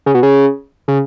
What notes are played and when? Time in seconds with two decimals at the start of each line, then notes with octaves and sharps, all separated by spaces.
0.06 C#3
0.14 B2
0.23 C#3
0.88 C#3